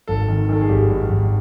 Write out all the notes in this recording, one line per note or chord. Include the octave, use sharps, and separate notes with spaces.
G#1 A4
D#3
D#3 A4
G#4
G#1 G4
G#1
G#1